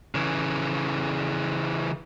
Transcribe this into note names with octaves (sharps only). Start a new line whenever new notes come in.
C#3 E3